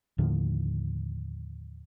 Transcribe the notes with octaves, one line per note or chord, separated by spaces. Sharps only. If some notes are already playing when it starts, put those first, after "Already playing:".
D#2 A2 D3 F3